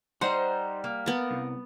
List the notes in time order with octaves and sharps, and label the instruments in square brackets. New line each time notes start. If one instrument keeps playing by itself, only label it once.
[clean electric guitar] G3 [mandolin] D#4 A#5 C6 [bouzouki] C5 [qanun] F#5
[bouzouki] A#3
[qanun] B3 A5 [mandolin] A#4
[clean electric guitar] C2